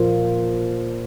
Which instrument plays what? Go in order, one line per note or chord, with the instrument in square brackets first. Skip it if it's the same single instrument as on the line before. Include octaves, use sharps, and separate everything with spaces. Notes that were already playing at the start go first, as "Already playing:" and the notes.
Already playing: [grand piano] A#2 F3 A#3 F4 C5